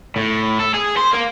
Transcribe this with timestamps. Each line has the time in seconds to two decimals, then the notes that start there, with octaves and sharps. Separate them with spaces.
0.16 A2
0.59 A4
0.74 G#4
0.97 C5
1.13 A#3